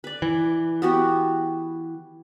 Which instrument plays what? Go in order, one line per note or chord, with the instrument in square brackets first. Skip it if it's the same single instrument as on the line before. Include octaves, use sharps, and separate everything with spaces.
[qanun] B4 D5
[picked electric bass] E3
[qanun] B3 F#4 G4